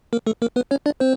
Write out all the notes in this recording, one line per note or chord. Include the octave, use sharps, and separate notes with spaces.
A#3 A#4
A3 A4
A#3 A#4
B3 B4
C#4 C#5
D4 D5
C4 C5